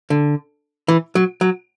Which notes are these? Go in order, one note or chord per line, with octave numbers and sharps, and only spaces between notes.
D3
E3
F#3
F#3